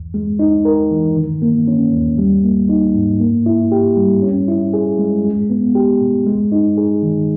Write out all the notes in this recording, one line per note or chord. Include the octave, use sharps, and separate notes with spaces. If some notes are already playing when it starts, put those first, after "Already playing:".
Already playing: E2
G#3
D#4
A#4
E3
D#3
A#3
C#4
D#2
G3
A#3
D#4
G#2
A#3
E4
G4
G3
C#4
E4
G#4
G#3
G#3
B3
G4
B2
G#3
D#4
G#4
D#3